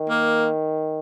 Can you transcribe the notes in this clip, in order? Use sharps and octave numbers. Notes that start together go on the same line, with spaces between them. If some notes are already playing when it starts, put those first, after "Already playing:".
Already playing: D#3
A#3